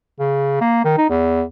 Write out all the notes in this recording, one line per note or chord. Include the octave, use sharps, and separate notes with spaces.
C#3
A#3
D#3
D#4
E2